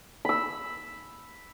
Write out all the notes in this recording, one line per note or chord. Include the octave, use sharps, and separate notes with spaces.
B5 E6